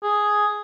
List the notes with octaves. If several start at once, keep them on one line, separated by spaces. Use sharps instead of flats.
G#4